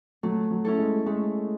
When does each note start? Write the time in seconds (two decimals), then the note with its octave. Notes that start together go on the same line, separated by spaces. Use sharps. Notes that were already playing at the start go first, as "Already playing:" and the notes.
0.23 F#3 A3
0.51 F#3
0.65 C#4 E4 A4
0.79 G#3
1.06 G#3 A3